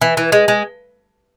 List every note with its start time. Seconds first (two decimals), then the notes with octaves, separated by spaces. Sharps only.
0.01 E3
0.17 E3
0.32 G#3
0.48 G#3